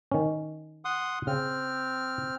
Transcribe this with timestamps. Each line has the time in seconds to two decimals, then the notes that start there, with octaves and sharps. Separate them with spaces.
0.11 D#3 C#4
0.85 F#5 C6 D#6
1.27 C#3 C4 F6